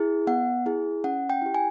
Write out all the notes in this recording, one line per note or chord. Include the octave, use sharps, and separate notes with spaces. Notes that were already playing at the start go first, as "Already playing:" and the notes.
Already playing: E4 G#4
B3 F#5
E4 G#4
C#4 F#5
G5
E4 G4
G#5